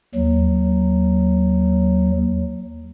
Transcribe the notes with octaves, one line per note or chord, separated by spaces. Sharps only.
D#2 F#3